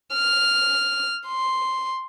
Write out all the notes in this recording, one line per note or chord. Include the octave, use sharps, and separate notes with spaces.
F6
C6